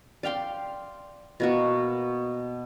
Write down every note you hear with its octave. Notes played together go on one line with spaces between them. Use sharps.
D5 F5 G5 C6
B2 A#3 F#4